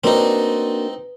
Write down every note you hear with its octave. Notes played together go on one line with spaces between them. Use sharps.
A#3 C4 D4 D#4 F#4 B4